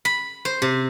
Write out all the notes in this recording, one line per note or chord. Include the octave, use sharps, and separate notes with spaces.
B5
C5
C3